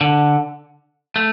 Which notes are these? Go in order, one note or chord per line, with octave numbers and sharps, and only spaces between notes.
D3
A3